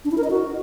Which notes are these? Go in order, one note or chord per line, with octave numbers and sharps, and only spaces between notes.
D4
E4
A#4
D#5
F#4